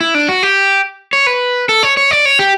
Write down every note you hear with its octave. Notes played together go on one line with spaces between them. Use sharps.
E4
D4
F#4
G4
C#5
B4
A4
C#5
C#5
D5
C#5
G4